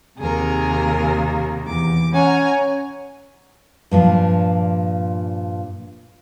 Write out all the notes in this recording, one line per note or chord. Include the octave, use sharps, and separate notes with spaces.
D#2 C3 G#4 A#4
E2 D6
C#4 F#5 G#5 A#5
G2 A#2 F3